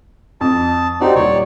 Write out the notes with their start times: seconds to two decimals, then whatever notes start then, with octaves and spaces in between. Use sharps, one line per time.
0.41 F2 A5
1.01 C4 D#4 F#4 G4 D5
1.15 D#1 C#5 D5